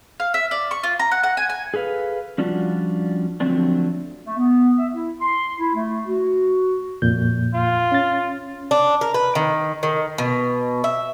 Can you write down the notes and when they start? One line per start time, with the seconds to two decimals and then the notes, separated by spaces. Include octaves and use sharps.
0.20 F5
0.34 E5
0.51 D5
0.71 C#6
0.83 F4
0.99 A#5
1.11 F#5
1.23 F#5
1.37 G#5
1.50 G#5
1.74 G#4 A4 B4 F5
2.38 F3 G3 C#4 D4 F4 F#4
3.40 D3 F3 F#3 A3 C4 D4
4.25 A3
4.38 B3
4.77 E5
4.93 E4
5.22 C6
5.59 E4
5.75 A3
6.07 F#4
7.02 F2 A#2 G6
7.54 F4
7.92 C#4 A6
8.71 D4
9.01 A#4
9.14 B4
9.35 D#3
9.83 D#3
10.18 B2
10.84 E5